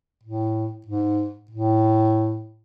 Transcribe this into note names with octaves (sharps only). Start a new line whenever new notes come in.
A2
G#2
A2